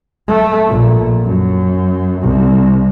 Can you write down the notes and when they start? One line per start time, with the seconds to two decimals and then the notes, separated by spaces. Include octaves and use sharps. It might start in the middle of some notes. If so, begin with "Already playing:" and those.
0.28 A3
0.68 A#1
1.24 F#2
2.20 C2